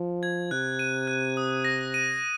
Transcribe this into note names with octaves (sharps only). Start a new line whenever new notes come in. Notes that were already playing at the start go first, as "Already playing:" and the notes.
Already playing: F3
G#6
C3 F#6
D#7
F#6
D#6
A#6
D#7